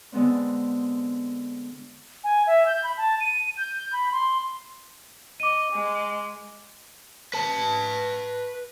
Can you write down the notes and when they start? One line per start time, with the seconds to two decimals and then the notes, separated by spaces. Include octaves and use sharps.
0.12 D3 G#3 B3 C4
2.24 G#5
2.47 E5
2.66 G6
2.84 B5
2.97 A5
3.20 D#7
3.57 G6
3.93 B5
4.12 C6
5.40 D#5 D6 D#7
5.73 G#3
7.34 B4 A5